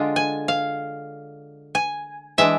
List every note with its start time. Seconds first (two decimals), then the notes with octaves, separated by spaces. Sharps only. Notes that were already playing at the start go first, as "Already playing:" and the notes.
Already playing: D3 G#3 D4 F4
0.16 G#5
0.48 F5
1.75 G#5
2.38 E3 G#3 D4 E5